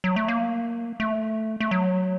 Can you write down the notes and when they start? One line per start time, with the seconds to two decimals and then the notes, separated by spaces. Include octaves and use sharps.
0.04 F#3
0.16 A3
0.28 A#3
1.00 A3
1.60 A3
1.71 F#3